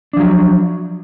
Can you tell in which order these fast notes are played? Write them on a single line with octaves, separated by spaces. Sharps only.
D4 F3 F#3